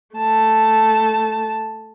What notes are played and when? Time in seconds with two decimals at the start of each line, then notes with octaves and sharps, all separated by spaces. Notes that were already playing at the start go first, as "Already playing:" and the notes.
0.16 A3 A5